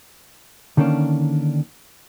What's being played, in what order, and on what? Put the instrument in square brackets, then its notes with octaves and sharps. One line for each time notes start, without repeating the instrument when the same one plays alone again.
[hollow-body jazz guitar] D3 D#3 A#3 C#4 D4